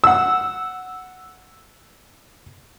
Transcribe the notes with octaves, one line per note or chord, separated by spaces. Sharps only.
F#5 E6